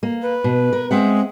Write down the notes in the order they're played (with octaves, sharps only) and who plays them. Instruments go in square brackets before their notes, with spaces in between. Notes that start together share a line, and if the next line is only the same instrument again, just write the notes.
[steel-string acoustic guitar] A#3
[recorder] B4
[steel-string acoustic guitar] B2
A#4
[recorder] G#3 [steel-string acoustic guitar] C4 E5 F#5